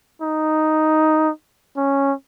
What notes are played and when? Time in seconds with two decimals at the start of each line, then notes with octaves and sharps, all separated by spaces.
0.22 D#4
1.77 C#4